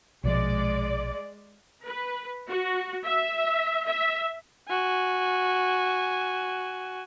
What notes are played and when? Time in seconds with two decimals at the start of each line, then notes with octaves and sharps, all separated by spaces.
0.24 A#1 B2 F3 G#3 D5
1.84 B4
2.48 F#4
3.05 E5
3.86 E5
4.69 F#4 G#5